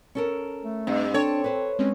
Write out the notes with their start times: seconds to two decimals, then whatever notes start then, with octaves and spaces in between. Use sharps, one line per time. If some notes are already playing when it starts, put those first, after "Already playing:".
0.15 C#4 A4 A#4
0.64 A3
0.87 G2 C4
1.14 C4 D4 A4 C#5
1.44 B4 C5
1.79 G#3 C4 C#4